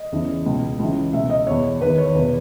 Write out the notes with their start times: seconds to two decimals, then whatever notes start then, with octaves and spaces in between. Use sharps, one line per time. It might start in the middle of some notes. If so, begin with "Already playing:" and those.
Already playing: D#5
0.12 E2 C#3 E3
0.46 C#2 B2
0.79 C#2 C#3 E3
1.13 C#2 B2 E5
1.30 D#5
1.47 E2 B2 C#5
1.80 E2 D#3 B4
1.98 C#5
2.15 E2 B2 B4